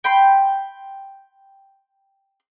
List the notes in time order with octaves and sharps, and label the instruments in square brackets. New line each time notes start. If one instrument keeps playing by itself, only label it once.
[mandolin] G5 B5 C6